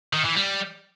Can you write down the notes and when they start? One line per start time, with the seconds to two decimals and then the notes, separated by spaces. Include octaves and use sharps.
0.13 D#3
0.25 E3
0.36 G3